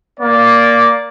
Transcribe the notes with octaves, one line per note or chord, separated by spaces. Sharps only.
A#3 D5